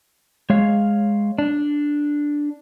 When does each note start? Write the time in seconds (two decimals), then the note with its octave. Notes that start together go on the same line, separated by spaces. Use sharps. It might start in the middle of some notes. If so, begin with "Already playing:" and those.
0.50 G#3 C#5 F5
1.38 D4